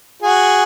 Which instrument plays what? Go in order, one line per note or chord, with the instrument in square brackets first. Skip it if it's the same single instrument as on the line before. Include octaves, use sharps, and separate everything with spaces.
[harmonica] F#4 G#4